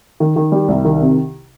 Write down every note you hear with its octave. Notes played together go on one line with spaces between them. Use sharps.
D#3
D#3
G3
C2
D#3
C3